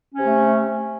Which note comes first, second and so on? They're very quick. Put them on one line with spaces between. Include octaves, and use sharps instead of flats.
C#4 C3 A3